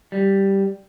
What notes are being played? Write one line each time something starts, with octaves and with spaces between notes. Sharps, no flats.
G3